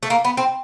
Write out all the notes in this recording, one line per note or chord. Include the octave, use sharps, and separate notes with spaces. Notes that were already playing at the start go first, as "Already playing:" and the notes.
A3
A#3
B3
C4